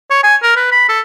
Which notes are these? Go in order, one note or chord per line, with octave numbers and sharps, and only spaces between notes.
C#5
G#5
A#4
B4
B5
A4